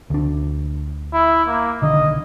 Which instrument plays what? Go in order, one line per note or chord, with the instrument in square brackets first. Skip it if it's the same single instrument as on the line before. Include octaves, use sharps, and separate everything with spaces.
[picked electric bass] D2 D4
[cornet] E4
A#3
[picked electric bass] B1 D3 D#3 [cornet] D#5